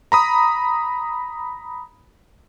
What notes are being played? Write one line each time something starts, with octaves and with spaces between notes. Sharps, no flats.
A#5 B5 D#6